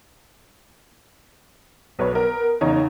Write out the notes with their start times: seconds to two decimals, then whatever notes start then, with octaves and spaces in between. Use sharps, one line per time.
1.99 B1 B4 C#5
2.13 B3 A#4
2.61 E2 C#3 D#4 C#5 A#5